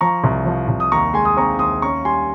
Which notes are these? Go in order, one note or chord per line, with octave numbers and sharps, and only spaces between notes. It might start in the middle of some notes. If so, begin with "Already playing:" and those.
F3 A#5 C#6
C2
F3
C2
D#6
D#2 A#5 C#6
G#3 G#5 C6
D#6
C4 A#5 C#6
D#2 C6 D#6
C#4 A#5 C#6
G3 G#5 C6